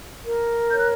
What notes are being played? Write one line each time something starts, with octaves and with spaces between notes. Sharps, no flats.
A#4
C#5 G6
F#6